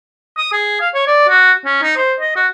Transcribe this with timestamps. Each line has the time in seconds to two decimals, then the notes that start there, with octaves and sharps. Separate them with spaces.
0.38 D#6
0.53 G#4
0.81 F5
0.94 C#5
1.07 D5
1.29 F#4
1.66 C#4
1.83 D#4
1.97 C5
2.20 D#5
2.36 F#4